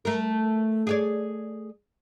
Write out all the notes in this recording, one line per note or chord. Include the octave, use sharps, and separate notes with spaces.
A3 A#4
G#4 C#5 D5